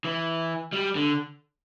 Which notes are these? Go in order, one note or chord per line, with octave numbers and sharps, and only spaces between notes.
E3
G3
D3